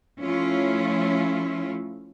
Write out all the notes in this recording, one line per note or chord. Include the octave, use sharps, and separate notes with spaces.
F3 A3 C#4 E4 F4